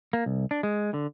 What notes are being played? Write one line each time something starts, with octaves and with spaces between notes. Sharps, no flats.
A#3
C2
D4
G#3
D3